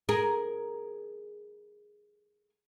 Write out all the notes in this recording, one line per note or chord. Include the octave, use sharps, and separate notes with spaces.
G#4 A#4